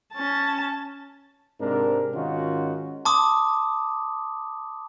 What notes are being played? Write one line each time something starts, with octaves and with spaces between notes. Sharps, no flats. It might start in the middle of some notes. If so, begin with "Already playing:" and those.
C#4 A5
G#2 C3 C4 D4 A#4
G#2 D#3 C#4 D#4 F4 F#4
A5 C6 D6 D#6